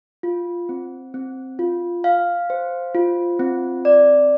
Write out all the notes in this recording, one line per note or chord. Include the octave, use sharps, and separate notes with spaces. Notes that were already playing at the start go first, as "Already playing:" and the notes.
F4
C4
C4
F4
F5
C5
F4
C4
D5